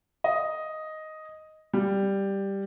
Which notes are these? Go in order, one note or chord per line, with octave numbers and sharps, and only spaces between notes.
D#5
G3